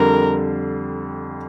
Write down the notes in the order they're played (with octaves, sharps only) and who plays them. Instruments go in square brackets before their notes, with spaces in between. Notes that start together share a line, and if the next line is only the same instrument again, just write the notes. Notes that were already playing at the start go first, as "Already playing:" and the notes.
Already playing: [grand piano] F2 D3 G3 [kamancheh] A#4